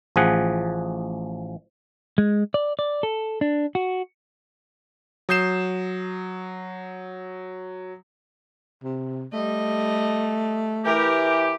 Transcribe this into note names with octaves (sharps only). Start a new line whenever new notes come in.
A1 F3 G#4 F#5
G#3
D5
D5
A4
D4
F#4
F#3 D#6 G6 C7 E7
C3
G3 A3 D#5
E3 G4 A#4